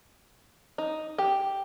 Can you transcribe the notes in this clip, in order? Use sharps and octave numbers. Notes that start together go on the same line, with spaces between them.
D#4
G4